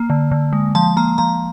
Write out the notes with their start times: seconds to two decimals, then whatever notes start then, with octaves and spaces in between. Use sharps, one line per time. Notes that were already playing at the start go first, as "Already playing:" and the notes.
Already playing: A#3
0.10 D3
0.31 D3
0.53 G#3
0.75 F3 A5
0.97 A#3 A#5
1.18 F3 A#5